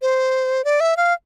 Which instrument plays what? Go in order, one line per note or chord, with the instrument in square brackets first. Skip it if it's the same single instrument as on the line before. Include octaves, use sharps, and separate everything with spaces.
[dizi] C5
D5
E5
F5